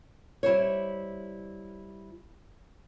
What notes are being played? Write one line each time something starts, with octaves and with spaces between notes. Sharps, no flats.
G3 E4 C5 C#5